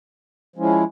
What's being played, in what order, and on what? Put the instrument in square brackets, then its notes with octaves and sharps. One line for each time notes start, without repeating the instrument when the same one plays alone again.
[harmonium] F3 G#3 C#4 E4